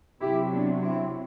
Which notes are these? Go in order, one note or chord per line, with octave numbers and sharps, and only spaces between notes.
C3 F#3 E4 G4
B3 D4
C4 E4